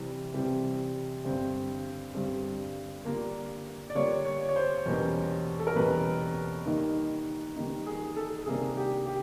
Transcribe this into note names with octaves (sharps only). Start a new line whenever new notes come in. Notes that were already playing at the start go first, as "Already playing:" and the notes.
Already playing: C3 E3 G3 C4
C3 E3 G3 C4
G2 D3 G3 C4
G2 D3 G3 C4
D3 G3 A#3 D4 F4
D5
D3 G3 A#3 D4 F4 C#5
C#5
C#5
C5
E2 B2 G3 A#3 C#4
A4
A#4
E2 B2 G3 A#3 C#4 B4
D#3 G3 A#3 D#4
D#3 G3 A#3 D#4
G#4
A4
C3 D#3 G3 A#3 D4 G#4
G4
G4